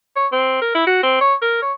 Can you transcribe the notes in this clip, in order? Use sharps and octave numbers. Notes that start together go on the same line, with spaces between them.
C#5
C4
A#4
E4
F#4
C4
C#5
A#4
C#5